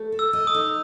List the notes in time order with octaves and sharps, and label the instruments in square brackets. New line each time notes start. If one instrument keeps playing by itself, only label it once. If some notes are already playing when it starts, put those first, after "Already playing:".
Already playing: [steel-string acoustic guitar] A3
A4
[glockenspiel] E6
[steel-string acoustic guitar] D#5
[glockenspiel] D#6
[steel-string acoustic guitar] D#4